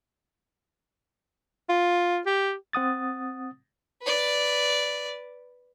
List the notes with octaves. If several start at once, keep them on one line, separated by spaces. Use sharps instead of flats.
F4
G4
C4 F#5 D#6 A6
B4 D5